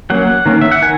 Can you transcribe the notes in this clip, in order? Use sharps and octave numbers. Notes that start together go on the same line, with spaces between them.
F#3 A#3 C#4 F#5
D#3 A#3 C#4
E5
F#5
D#3 G#5